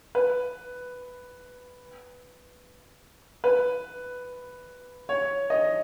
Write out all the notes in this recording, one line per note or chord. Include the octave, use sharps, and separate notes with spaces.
B4
B4
C#5
D#5